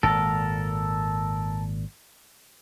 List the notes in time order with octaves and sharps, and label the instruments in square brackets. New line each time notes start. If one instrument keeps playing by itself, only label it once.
[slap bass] G#1 A#2 [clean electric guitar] A4 A#4